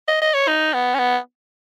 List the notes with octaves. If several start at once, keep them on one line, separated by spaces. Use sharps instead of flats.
D#5
D#5
C#5
D#4
B3
C#4
B3